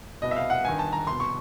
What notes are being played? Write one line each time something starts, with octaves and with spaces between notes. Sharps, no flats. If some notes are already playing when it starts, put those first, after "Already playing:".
C2 B2 D#5
E5
F5
F#5
G1 G2 D#3 G#5
A5
A#5
C2 B2 C6
C#6